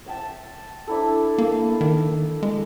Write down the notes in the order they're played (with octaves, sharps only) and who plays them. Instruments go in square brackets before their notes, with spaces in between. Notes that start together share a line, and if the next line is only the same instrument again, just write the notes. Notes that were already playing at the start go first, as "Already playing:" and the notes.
[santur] E5 G5 A5
D4 E4 A4
[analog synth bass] A#3
D#3
G#3